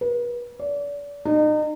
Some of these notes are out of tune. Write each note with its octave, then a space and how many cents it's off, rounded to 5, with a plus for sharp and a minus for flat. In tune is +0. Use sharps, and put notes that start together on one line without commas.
B4 -40
D5 -35
D#4 -35